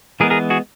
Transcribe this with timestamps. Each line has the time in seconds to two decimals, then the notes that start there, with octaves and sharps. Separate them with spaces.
0.20 E3 G#3 B3 G#4 A#4
0.30 G#4 A#4
0.50 F#4 G#4